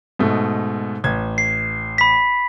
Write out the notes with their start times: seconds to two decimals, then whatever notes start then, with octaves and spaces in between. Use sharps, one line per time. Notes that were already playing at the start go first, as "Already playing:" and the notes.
0.19 G#2 B2 A3
1.04 A1 G#6
1.38 C7
1.98 B5 B6